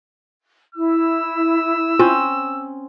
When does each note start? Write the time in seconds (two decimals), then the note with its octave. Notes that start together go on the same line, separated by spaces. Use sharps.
0.75 E4 E6
1.99 C4 C#4 F4